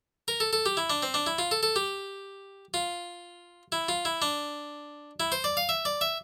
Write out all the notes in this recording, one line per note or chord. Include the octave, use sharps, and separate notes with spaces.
A#4
A4
A4
G4
E4
D4
C4
D4
E4
F4
A4
A4
G4
F4
E4
F4
E4
D4
E4
C5
D5
F5
E5
D5
E5